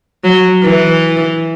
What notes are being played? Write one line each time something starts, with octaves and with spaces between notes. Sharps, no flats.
F#3
E3